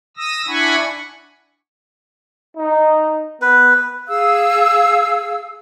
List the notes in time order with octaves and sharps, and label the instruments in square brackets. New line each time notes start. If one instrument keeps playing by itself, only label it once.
[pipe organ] D#6 E6 A#6
D4 E4 F#5 G#5 B5 C#6
[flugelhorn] D#4
[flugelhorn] B3 [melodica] B4
[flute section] G#4 F5 E6